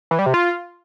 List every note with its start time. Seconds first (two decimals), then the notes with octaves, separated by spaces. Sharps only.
0.11 E3
0.19 G3
0.26 C3
0.34 F4